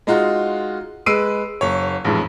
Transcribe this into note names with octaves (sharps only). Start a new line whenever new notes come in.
G#3 D#4 F4 F#4
G#3 B4 E6 C7 D7 D#7
F#1 C#5
A1 F2 G#2